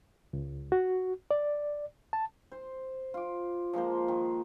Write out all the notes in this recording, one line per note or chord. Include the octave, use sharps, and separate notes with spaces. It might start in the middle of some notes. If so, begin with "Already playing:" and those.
C#2
F#4
D5
A5
C5
F4 D6
F3 G#3 A#3 C5
D#3